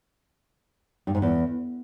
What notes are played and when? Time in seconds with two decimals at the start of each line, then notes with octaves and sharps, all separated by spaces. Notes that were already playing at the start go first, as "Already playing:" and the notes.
1.07 G2
1.15 G#2
1.22 E2